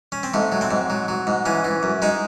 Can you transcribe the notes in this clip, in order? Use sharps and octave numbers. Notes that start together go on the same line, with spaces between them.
C#4
C4
G#2 A3
F#3
C4
G#2
F#3
F#3
G#2
E3 C#4
E3
F#2
G#3 D#4